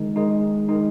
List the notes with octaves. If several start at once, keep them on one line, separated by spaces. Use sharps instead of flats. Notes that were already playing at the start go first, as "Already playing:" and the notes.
Already playing: D#3 G#3 D#4
D#3 G#3 D#4
D#3 G#3 D#4